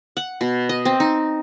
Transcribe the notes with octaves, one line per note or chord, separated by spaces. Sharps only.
F#5
B2
D#5
C4
D#4